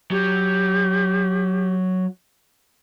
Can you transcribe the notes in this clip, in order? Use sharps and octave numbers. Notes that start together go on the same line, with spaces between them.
F#3 G4